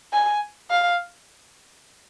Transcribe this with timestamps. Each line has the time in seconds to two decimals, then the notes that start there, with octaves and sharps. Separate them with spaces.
0.13 G#5
0.70 F5